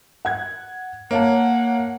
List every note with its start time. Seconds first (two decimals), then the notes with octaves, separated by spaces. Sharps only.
0.25 F#5 G#6
1.11 A#3 C#5 F5 F#5 A5